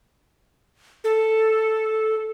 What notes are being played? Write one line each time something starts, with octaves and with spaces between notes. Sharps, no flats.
A4